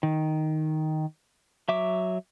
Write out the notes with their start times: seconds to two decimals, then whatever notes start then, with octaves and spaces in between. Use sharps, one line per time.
0.03 D#3
1.68 F#3 E5 D6